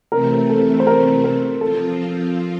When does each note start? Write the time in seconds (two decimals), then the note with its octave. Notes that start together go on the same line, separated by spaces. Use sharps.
0.12 C3 E3 A3 C4 A#4
0.49 A4
0.80 C5
0.87 A#4
1.24 A#4
1.61 F3 C4 F4 A4